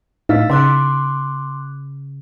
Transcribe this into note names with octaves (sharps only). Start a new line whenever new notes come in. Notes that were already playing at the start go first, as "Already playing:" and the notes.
A2 D#4 E4 F5 E6 A6 B6
C#3 C6 D6 F#6